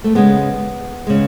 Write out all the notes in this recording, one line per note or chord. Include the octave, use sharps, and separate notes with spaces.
A3
C#3 G#3 B3
C#3 G#3